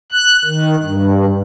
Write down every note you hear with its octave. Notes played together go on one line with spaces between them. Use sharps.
F#6
D#3
G2